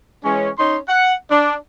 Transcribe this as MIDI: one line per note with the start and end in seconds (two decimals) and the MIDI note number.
0.25 0.50 52
0.25 0.50 56
0.25 0.50 61
0.58 0.78 61
0.58 0.78 63
0.58 0.78 84
0.88 1.15 78
1.31 1.55 62